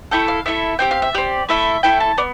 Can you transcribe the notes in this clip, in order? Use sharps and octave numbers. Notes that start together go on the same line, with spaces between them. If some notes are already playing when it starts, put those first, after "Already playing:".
A3 E4 A4 G5
F5
A3 E4 A4 E5
C4 G4 G5
F5
E5
C4 G4 D5
A3 E4 A4 E5
A3 E4 A4 G5
A5
B3 D5